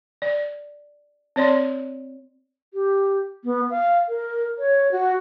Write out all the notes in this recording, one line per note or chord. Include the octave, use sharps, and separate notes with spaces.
D5
C4 C#5 D5 C6
G4
B3
F5
A#4
C#5
F#4